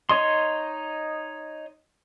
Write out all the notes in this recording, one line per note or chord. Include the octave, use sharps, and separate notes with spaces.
D#4 C#5 D#5 C6